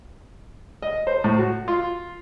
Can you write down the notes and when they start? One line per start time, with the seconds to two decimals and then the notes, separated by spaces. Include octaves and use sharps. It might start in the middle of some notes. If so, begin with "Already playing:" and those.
0.82 D#5
1.07 C5
1.24 A2
1.38 F#4
1.68 F4